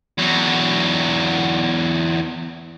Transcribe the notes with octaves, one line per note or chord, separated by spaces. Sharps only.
E2 F#3